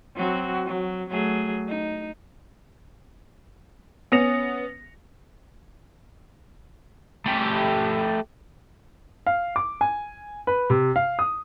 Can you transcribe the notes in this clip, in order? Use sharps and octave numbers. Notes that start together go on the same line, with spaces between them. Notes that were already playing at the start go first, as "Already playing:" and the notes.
F#3 C4 F#4
F#3
F#3 A3 G#4
D#4
B3 C#4 D#6 A#6 C#7 F7
A3 G4
F5
D6
G#5
B4
C3
F5
D#6